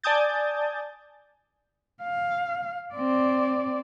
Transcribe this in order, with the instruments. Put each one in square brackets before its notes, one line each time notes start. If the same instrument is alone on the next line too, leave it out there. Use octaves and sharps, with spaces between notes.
[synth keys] D5 G#5 A5 D#6 G6 A6
[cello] F5
C4 D5